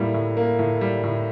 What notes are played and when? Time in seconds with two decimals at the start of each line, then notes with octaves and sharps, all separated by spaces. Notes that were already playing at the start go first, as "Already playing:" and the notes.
Already playing: A2 G3 A#3 E4
0.14 A2
0.37 A#3
0.59 A2
0.81 G3
1.03 A2